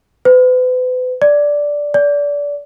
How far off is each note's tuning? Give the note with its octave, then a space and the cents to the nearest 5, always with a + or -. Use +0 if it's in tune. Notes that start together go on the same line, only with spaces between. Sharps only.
B4 +40
D5 -5
D5 -25